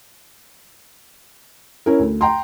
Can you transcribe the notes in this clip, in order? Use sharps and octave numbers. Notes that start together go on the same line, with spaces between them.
C#4 E4 A#4
D2
G5 A#5 C6